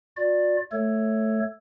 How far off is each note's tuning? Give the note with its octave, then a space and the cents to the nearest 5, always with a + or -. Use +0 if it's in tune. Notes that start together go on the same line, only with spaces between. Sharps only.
F#4 -45 D5 +5
A3 -5 A4 +10 C#5 -5